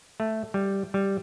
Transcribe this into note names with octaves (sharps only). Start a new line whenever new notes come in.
A3
G3
G3